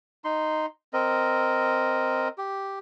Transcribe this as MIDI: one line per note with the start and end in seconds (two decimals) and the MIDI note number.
0.24 0.66 63
0.24 0.66 84
0.93 2.28 60
0.93 2.28 70
0.93 2.28 75
2.38 2.79 67